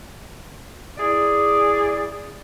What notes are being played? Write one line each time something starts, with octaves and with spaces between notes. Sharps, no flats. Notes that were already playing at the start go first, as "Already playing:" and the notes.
E4 G#4 D5